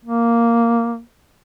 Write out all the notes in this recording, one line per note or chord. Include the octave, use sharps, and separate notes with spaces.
A#3